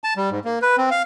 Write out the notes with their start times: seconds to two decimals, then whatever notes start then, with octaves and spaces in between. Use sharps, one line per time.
0.04 A5
0.17 G3
0.31 G#2
0.45 A#3
0.62 B4
0.78 C4
0.91 F5